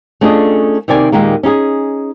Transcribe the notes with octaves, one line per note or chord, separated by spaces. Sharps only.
A3 C#4 D4 F4 G#4 D#5
C3 D#3 A#3 D5 G#5
D#2 A#2 D#3 G#3 A#3
C#4 D#4 G4 G#4